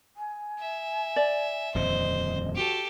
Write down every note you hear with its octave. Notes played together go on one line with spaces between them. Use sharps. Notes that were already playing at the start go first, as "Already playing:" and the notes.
G#5
E5
D5
D#1 F2 D3 C5 D#5
F#4 G4 A4